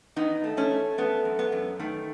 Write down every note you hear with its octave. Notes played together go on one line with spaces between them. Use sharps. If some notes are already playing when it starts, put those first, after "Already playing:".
D#3 B3 D#4
A3
A3 C#4
A3
A3 B3
F#2
B3
F#2
D#3 A3